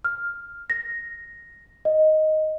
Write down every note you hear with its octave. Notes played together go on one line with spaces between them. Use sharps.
F6
A#6
D#5